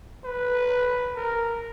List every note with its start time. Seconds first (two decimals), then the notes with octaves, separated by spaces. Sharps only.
0.24 B4
1.16 A#4